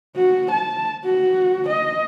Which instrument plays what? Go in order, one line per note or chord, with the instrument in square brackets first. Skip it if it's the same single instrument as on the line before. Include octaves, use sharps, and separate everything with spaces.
[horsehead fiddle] F#4
A5
F#4
D#5